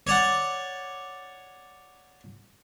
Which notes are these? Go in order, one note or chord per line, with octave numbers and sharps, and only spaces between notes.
C#5 D5 F#5